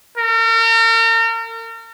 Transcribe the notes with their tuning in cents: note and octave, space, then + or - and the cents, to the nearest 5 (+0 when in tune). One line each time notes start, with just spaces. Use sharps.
A#4 -40